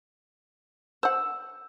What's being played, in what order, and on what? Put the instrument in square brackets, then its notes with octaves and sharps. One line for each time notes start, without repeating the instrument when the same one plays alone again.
[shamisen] C5 F#5 [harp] E6